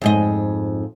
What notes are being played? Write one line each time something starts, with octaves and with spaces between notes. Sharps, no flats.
F2 G#2 D#5